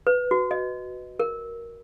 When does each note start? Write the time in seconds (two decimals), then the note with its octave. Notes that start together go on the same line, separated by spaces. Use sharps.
0.07 B4
0.31 F#4
0.51 D#5
1.20 A#4